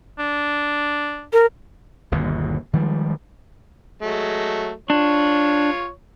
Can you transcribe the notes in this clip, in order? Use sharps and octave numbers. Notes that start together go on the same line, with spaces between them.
D4
A#4
G1 D#2 B2
D#3 F3 G3 G#3
F#3 G#3 A3
D4 F4 C#5